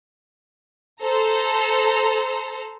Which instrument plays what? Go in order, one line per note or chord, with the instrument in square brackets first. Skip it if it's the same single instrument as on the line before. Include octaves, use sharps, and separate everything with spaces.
[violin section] A4 C5 A#5